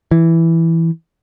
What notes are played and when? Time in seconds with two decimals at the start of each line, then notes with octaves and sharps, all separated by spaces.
0.11 E3